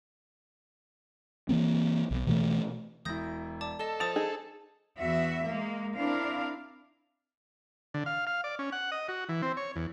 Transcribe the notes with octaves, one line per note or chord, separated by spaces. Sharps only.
E3 A#3 C4
B1
B2 E3 F#3 A3
E1 E4 D#6 G6 A#6
D5 A5 D6
A4 D#5 E7 G7
F3 C5 D#6 E6 A6 E7 F7
D#4 G#4
E2 F#4 E5
G#3 A#3
C4 D4 E4 A#4 F5
D3
F5
F5
D5
C#4
F#5
D#5
F#4
E3
C4
C#5
E2